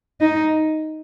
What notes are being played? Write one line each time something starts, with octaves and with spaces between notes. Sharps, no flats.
D#4